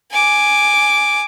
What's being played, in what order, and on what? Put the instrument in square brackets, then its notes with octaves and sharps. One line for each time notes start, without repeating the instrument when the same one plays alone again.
[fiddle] G#5 D6